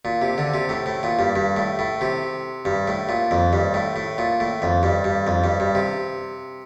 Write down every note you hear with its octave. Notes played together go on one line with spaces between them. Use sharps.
A#2
C3
D3
C3
A2
A2
A#2
G2
G2
A2
A2
C3
G2
A2
A#2
F2
G2
A2
A2
A#2
A2
F2
G2
G2
F2
G2
G2
C3